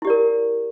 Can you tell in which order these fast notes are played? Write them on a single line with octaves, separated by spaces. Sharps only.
E4 G4 D5 A#4